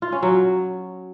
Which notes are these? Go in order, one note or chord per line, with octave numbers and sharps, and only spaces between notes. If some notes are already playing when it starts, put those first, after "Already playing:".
F4
C#4
F#3